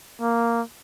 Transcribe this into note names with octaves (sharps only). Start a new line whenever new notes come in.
A#3